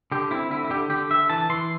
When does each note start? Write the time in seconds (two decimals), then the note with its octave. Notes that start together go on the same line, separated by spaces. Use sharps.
0.12 D3 G4
0.31 C4 E4
0.51 D3 E4
0.64 E4
0.70 D3 G4
0.90 D3 G4
1.10 D3 E5
1.30 E3 A5
1.50 E3 C6